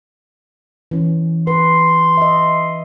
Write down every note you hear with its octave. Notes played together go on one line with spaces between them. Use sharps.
E3 C#4
B4 C6
D#5 E5